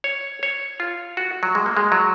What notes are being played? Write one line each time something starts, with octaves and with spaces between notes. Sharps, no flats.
C#5
C#5
F4
F#4
F#3
G#3
A#3
G#3
F#3